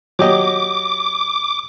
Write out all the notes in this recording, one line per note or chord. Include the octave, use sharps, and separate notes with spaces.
F#3 G4 D#5 D6